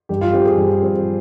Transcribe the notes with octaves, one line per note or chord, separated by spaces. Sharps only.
G2 G4
F4
F3 C4 G4
G#4
G2
F3 C4